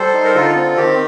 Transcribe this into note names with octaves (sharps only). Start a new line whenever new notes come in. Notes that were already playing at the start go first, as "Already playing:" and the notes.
Already playing: G3 A4 C5
D#4
A#4
D3 F4 A4
C4
D#3 G4